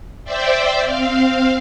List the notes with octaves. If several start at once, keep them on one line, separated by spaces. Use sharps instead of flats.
C5 D5 E5 G5
C4 F5